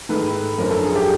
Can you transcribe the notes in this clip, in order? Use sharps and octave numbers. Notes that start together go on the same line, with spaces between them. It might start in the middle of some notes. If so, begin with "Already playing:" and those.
G#2 D#3 A4 B4
F#2 D3 F3 A#4
A4
G#4
G4 A4